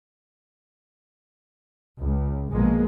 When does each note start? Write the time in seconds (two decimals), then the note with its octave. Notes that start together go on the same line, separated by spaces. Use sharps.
2.00 C#2
2.52 A#1 B2 F3 G#3 A#3